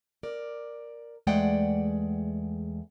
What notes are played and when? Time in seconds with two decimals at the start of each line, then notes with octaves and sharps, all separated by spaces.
0.23 A#4 D5
1.27 E2 G#3 A3 D5 F#5 G5